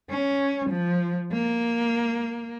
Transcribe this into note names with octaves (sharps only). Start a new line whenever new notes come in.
C#4
F3
A#3